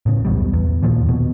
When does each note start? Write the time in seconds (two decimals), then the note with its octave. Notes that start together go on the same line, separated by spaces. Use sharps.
0.06 A2 C#3
0.25 B1 E2 B2 G3
0.53 E2
0.83 D#2 A#2 F3
1.09 B2